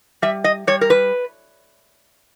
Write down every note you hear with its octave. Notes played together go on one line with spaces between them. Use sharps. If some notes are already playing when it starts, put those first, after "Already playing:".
G3 E5
D#5
G3 C#5
A#4
B4